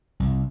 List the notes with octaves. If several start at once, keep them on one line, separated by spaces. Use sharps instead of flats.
C2